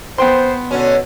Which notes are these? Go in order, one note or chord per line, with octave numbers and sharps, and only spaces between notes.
B3 C5 G5 C6
B2 D3 C#4